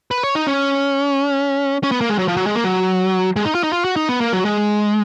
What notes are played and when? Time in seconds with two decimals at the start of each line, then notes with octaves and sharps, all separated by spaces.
0.11 B4
0.23 C#5
0.35 D#4
0.47 C#4
1.83 C#4
1.92 B3
2.01 A#3
2.09 G#3
2.19 F#3
2.28 F3
2.37 F#3
2.47 G#3
2.55 A#3
2.64 F#3
3.36 G#3
3.45 D#4
3.55 F4
3.63 D#4
3.73 F4
3.85 F#4
3.96 D#4
4.09 B3
4.21 A#3
4.33 F#3
4.45 G#3